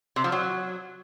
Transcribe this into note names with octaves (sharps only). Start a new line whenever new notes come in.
C3
F3
F#3